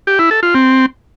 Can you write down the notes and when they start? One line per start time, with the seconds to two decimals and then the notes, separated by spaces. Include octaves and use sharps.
0.07 G4
0.19 E4
0.31 A4
0.43 F4
0.55 C4